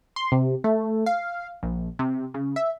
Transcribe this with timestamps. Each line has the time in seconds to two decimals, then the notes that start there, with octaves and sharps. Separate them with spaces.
0.16 C6
0.32 C3
0.64 A3
1.06 F5
1.63 A#1
1.99 C3
2.34 C#3
2.56 E5